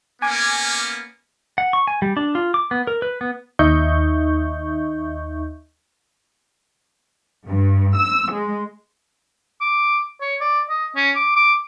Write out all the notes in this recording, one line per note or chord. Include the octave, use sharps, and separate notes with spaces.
A#3 B3 C#4 G#5 D6 G#6
F#5
C#6
G#5
G3
D4
F4
D6
B3
A#4
B4
B3
D#2 D#4 D#5 E5 C#6 G6
G2
E6
G#3
D6
C#5
D5
D#5
C#4
D6
D6